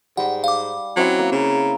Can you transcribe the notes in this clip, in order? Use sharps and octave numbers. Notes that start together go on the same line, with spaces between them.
G#2 G3 F#5
F5 D6
F#3 C4 C#4 E4
A#3
C#3